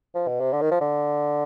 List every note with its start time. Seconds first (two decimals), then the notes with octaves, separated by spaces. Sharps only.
0.15 F3
0.27 B2
0.40 C3
0.53 D3
0.62 D#3
0.71 F3
0.81 D3